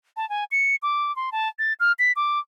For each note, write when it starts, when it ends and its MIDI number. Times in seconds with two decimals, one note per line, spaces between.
0.17 0.28 81
0.29 0.44 80
0.51 0.75 97
0.82 1.14 86
1.16 1.30 84
1.32 1.48 81
1.59 1.73 93
1.80 1.92 89
1.99 2.12 95
2.16 2.39 86